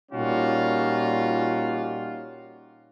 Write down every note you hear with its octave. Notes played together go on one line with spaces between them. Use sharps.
A#2 G3 C#4 D#4 F4 F#4